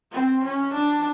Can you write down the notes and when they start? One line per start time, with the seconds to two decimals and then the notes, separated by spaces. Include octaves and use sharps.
0.12 C4
0.44 C#4
0.73 D4